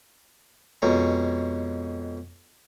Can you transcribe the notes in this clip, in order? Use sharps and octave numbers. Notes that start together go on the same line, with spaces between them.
F2 B2 G#3 C#4 A#5